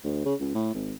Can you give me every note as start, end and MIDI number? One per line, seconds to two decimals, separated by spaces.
0.04 0.23 38
0.25 0.35 49
0.40 0.53 37
0.55 0.73 45
0.75 0.93 32